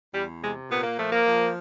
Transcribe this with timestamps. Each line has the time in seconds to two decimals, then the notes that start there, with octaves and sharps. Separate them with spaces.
0.14 E2 G3
0.42 C3 G#3
0.70 A#2 B3
0.84 A#3
0.98 F3 A3
1.11 A#3
1.26 F3